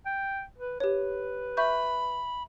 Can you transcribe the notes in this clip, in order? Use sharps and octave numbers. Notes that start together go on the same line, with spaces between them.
G5
B4
G4 B4 C#5
E5 B5 C#6 G6